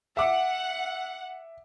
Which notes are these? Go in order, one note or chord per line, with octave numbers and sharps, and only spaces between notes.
E5 F#5 D6